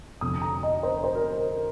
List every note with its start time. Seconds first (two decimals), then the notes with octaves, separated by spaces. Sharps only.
0.21 F1 F2 D3 D#6
0.42 A#5
0.63 D#5
0.83 C5
1.04 C5
1.15 A#4
1.38 A#4